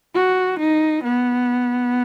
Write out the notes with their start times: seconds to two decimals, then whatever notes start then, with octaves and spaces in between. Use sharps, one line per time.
0.14 F#4
0.59 D#4
1.04 B3